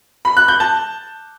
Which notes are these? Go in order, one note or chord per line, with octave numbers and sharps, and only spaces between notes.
B5
F#6
G6
A5